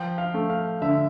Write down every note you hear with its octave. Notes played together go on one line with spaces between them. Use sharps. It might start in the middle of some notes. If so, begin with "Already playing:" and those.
Already playing: F3 G5
F5
A3
F5
D3 E5